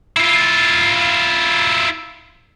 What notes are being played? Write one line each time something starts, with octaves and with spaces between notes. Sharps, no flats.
E4 F4